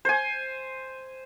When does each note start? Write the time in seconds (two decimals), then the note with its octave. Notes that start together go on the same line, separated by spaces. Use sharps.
0.05 C5 G#5